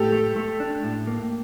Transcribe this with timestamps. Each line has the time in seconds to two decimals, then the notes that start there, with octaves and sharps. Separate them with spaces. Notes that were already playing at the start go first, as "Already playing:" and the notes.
Already playing: A2 G4 A4
0.12 A3
0.36 A3
0.60 D4
0.84 A2
1.07 A#3